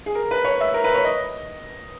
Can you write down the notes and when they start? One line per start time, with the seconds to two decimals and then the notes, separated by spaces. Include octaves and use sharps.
0.06 G#4
0.15 A#4
0.31 B4
0.45 C#5
0.60 E5
0.74 A#4
0.84 B4
0.94 C#5
1.04 D#5